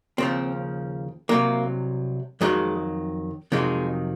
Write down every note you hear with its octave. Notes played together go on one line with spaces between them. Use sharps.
D#2 C#3 F3 C4
C2 C3 F#3 A#3
F2 D#3 F#3 G#3
F2 C3 D#3 F#3 G#3